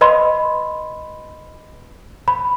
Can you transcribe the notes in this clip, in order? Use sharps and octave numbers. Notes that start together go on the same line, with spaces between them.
B4 D#5 B5 C6
B5